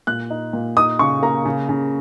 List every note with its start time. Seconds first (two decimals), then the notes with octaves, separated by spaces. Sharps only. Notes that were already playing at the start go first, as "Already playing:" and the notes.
0.07 A#2 F#6
0.30 D#4
0.53 A#2
0.77 D#4 D#6
0.99 C#3 C#6
1.23 A#3 A#5
1.45 C#3
1.69 C#3